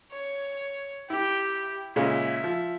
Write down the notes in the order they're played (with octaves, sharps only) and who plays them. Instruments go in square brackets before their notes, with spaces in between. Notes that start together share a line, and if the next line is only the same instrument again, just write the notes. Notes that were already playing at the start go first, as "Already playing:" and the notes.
[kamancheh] C#5
[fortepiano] E4 [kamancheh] G4 G5
[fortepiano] A#2 C#3 G#3 [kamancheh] E5
[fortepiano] F3